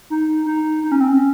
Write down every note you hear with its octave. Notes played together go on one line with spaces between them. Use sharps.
D#4
D#4
D#4
C#4
C4
C#4